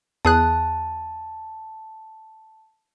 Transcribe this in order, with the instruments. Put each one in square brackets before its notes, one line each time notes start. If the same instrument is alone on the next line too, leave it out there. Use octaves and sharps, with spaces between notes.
[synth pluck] E2 G#4 F#6 [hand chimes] A5